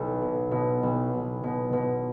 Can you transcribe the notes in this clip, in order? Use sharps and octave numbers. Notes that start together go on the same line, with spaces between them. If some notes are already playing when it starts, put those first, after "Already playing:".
Already playing: B1 A4
B2
B2
B1
B1
B2
B2